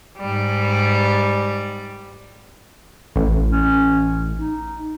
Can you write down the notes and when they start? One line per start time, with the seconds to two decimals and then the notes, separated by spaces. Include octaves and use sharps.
0.19 G#2 G3
3.16 A1
3.51 C#4
4.37 D#4